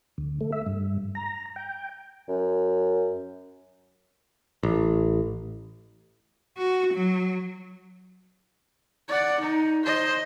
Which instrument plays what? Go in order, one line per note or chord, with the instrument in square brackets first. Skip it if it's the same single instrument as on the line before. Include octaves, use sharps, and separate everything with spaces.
[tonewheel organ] D2
A3
E5
G2
A#5
G5
[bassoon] F#2
[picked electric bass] A1
[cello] F#4
F#3
[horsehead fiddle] D5 F#5
D#4
C5 D#5